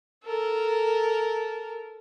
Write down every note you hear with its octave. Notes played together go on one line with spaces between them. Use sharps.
A4 A#4